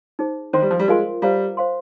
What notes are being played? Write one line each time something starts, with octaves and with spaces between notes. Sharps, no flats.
D#4 G#4 C5
D#3 C5 G5 C6
G3
F3
G3
G#3 F4 A#4 F5 G#5 C6
G3 C5 F5 A#5
C5 F5 C6